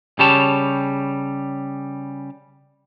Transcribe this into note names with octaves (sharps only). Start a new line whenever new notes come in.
C#3 G3 G4 C#5 A5